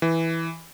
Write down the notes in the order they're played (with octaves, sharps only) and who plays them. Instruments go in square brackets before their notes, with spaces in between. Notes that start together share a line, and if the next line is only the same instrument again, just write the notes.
[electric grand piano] E3